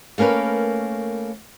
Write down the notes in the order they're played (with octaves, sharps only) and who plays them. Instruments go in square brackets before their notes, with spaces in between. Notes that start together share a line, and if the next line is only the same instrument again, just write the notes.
[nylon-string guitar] A3 A#3 C#4 A#4 B4